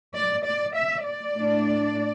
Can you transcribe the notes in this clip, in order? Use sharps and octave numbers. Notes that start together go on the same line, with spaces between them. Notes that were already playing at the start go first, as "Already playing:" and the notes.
D5
D5
E5
D5
A2 A3 D4